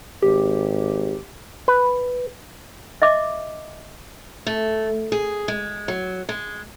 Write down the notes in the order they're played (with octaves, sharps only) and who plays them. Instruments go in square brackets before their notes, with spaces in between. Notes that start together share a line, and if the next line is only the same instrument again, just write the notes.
[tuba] G#1 [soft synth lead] G4
[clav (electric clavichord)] B4
[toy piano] D#5 E5 D6
[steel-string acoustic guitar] A3
G#4
G#3
F#3
G#3